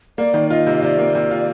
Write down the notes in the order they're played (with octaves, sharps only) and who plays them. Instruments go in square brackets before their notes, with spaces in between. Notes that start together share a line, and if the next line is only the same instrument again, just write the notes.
[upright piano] A#3 [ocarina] D5
[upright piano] D#3
[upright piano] F4 [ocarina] D#5
[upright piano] C3
[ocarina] D#5
[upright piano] C3 [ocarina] D5
[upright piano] A#3
C3
F4